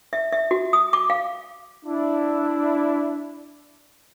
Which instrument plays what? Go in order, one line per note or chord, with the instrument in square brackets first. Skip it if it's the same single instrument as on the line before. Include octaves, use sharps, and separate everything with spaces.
[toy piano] E5
E5
F#4
D#6
D6
F5
[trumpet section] D4 E4